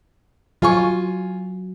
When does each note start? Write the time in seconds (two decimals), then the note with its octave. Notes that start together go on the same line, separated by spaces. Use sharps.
0.62 F#3 F4 G#5 C#6